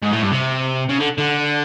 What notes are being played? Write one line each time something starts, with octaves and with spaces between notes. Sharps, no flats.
G#2
A2
G2
C3
C#3
D3
D3